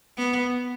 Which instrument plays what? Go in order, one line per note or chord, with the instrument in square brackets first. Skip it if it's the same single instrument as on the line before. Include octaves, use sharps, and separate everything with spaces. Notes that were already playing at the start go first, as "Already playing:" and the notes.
[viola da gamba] B3